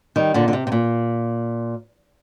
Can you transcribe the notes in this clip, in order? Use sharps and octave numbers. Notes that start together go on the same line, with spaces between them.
D#3 G3
A#2 D3
D3
C3
C3
A#2